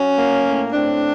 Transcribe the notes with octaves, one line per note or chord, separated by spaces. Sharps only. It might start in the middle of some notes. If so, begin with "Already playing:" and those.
Already playing: F#3 C#4
A#3
A2
A2 C4 D4